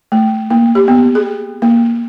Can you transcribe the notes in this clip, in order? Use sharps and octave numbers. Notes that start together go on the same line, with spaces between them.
A3
A#3
G4
B3
G#4
A#3